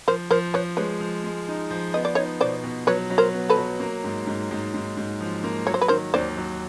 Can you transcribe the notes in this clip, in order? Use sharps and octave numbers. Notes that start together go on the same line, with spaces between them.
F3 A#4 C5
F3 A#4 C5
F3 B4 C#5
G#3 B4 C#5
F3
G#3
D#4
F3
B3 D#5
D5
D#4 C#5 D#5
B2 C5 D5
B2
F#3 B4 C#5
F#3
A#4 C5
B3
A4 B4
F#3
A#3
G#2
G#2
G#2
G#2
G#2
F3
A#3
F#3 C#5
C5
B4
D#3 A#4 C5
D#2 C5 D5
F#3